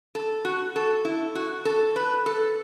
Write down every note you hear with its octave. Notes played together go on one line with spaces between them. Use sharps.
A4
F#4
A4
E4
F#4
A4
B4
A4